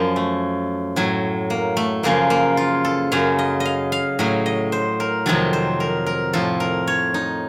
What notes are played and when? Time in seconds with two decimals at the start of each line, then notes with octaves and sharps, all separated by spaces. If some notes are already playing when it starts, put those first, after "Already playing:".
Already playing: F#2 F3
0.16 A3
0.96 A2 F#3
1.50 A#3
1.77 A3
2.03 F#2 C#3 F3 A#3
2.30 A#3
2.57 F4
2.85 A4
3.12 F#2 C#3 F#3 F5
3.39 D#5
3.60 D#5
3.65 F5
3.92 F5
4.19 A2 F#3 D#5
4.46 D#5
4.72 C5
5.00 A#4
5.26 F2 C3 D#3 F#3 A4
5.53 C5
5.80 A#4
6.06 A#4
6.33 A2 F3 A4
6.60 A#4
6.87 C#5
7.14 D#4